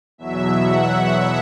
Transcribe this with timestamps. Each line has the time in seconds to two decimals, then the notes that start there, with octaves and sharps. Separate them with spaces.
0.18 E2 B2 F#3 E5
0.59 F#5